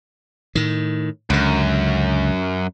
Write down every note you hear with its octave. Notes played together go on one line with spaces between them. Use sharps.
A2 D#3
C#2 F#2 D3